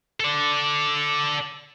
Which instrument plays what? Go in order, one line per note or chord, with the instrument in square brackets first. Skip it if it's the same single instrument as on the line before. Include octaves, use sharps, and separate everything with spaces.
[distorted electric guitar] A4 D5